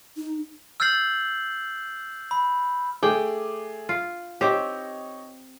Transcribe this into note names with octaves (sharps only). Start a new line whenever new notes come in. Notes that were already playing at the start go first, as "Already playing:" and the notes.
D#4
E6 F6 G6 A6 C7 F#7
B5
A3 G#4 G5 D6
F4
C4 D#4 G4 C#5 D#5